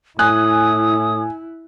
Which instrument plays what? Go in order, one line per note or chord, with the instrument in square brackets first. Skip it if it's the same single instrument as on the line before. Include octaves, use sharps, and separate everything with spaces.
[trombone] A2 [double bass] E4 [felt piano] G#5 F#6 [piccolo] D#6